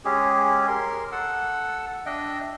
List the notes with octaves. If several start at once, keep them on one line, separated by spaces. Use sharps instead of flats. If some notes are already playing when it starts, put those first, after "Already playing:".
G#3 C#4 G4 G#4
A#4 C6
A4 F#5 E6
D4 D#5 E5 G5